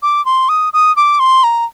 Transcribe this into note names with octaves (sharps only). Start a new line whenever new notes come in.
D6
C6
D#6
D#6
D6
C6
A#5